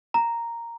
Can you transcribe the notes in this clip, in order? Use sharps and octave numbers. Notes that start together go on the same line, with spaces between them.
A#5